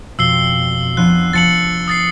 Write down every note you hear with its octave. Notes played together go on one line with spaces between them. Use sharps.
F2 B2 E6 C7 G7
F3 B3 D4 F#6
F1 F3 A5 A6 C#7 F#7
D#6 A6 C7